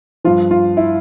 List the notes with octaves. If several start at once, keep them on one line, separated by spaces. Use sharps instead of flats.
G2 F3 F4
F4
E4